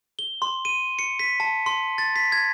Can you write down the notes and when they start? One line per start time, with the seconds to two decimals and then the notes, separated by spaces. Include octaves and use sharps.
0.19 G7
0.42 C6
0.65 D#7
0.99 C#7
1.19 B6
1.40 A5
1.66 C6
1.98 A6
2.16 B6
2.32 G#6